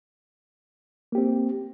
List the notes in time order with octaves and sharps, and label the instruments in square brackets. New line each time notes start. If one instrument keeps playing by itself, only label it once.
[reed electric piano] A#3
G4
C4